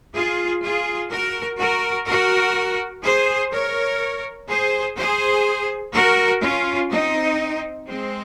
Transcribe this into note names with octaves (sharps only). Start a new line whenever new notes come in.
F4 G#4
F4 G#4
F#4 A#4
F#4 A#4
F#4 A#4
G#4 C5
A#4 C#5
G#4 C5
G#4 C5
F#4 A#4
C#4 F4
C4 D#4
G#3 C4